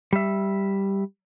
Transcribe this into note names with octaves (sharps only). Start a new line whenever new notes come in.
G3 E5